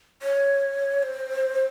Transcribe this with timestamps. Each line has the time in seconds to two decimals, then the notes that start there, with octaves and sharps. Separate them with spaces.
0.22 C#5
1.03 C5